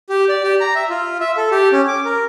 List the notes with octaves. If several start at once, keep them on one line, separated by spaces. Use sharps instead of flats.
G4
D5
G4
A#5
E5
F4
E5
A4
G4
C#4
D6
A#4